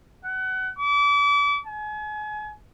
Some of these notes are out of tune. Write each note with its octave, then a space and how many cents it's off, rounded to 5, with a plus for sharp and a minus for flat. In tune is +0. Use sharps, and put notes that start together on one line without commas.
F#5 +25
D6 -35
G#5 +35